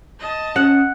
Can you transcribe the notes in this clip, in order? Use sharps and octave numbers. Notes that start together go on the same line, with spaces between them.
D#5 A5
C#4 F#5